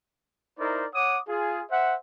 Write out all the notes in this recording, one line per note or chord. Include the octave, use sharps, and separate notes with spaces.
D#4 E4 A#4 C5 D5
C#5 F#5 D6 D#6
F4 G#4
C5 E5 F#5